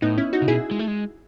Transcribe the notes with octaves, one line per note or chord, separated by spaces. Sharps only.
A2 B3 D#4
C#4 E4
D#4 F#4
C#3
B2 E4 G#4
G#3
A3
G#3